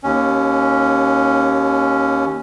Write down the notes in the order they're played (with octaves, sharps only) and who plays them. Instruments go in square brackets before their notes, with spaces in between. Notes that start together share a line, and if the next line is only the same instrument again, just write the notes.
[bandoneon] D#2 C#4